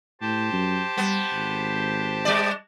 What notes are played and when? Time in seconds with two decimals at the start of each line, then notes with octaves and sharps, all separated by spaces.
0.21 A2 G4 C5 A5
0.52 F#2
0.98 G3 B3
1.32 G#1
2.25 G3 D5